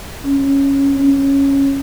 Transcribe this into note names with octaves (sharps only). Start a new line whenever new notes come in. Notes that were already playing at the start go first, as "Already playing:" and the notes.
C#4
C#4